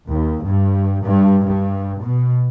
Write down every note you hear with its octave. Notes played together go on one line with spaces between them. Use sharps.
D#2
G2
G2
G2
B2